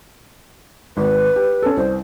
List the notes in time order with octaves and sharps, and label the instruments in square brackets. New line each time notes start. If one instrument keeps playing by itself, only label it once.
[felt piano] G#1 [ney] B4
[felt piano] G4
C#4 A4
[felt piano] C2 [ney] C5